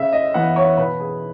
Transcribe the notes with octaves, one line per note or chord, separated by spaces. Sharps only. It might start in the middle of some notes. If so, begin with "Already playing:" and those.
Already playing: C#3 E5
D#5
E3 B3 F#5
C#5
B2 B4
G#4